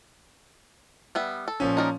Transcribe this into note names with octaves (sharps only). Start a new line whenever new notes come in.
G3 B3 E5
A4
A#2 F3 C#4
D#4 A#4 D5